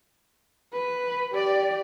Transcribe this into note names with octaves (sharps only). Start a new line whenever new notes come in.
B4
G4 D5